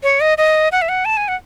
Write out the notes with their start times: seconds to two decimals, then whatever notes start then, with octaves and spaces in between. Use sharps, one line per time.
0.03 C#5
0.21 D#5
0.38 D#5
0.72 F#5
0.82 E5
0.89 F#5
1.05 A5
1.17 G#5
1.28 F#5